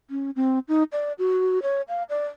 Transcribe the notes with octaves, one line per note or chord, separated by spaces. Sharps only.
C#4
C4
D#4
D5
F#4
C#5
F5
D5